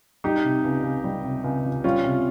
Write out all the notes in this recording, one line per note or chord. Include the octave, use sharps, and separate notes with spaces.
G3 D#4 G4
C3
C#2
C#2
G3
C3
C#2
C#2
G3 C#4 F4
C3